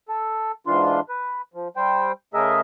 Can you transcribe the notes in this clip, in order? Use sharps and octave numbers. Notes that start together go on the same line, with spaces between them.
A4
G#2 E3 D4 F4 C6
B4
F3
G3 C5 G5
C#3 A3 G#4 A#4 D#5 E5